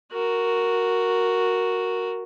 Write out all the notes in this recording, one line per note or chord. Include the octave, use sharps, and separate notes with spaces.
F#4 A#4